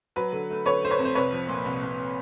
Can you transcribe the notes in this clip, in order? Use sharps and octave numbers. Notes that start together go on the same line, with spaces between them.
F#3 B4
D3
A3
D3 B4 C#5
A3 C5
B4 C#5
F2
C5
C2 B4 C#5
F3
A#2
C2
C2